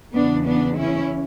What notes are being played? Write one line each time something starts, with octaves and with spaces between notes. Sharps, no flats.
E2 C#3 E3 B3 D4
B3 D4
C#4 E4